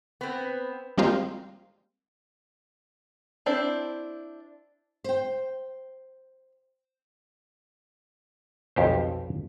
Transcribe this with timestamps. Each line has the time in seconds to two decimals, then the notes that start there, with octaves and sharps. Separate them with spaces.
0.21 B3 C4
0.98 G3 G#3 A#3 C4 F4
3.46 C4 D4 E4 C5
5.04 C5 G5
8.76 B1 F2 G4 C5